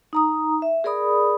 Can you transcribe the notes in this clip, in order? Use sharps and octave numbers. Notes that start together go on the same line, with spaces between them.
D#4 A#5 D#6
E5
G#4 A#4 D5 B5 D#6